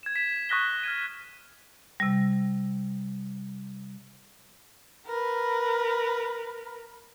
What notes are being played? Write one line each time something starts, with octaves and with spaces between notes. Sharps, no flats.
G#6 E7
B6 E7
C#6 D#6 F#6 A#6 B6 G7
F6 G#6 D#7
C3 G3
A#4 B4